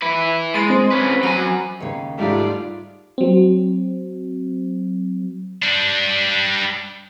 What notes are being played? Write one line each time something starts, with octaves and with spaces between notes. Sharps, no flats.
E4 B4
G#3 A6 D#7
C4 C5
C#4 B4
F#3 G#5 B5
D#2 C#3
G#2 G3 A3 F4 D5
F#3 C4
G3 D4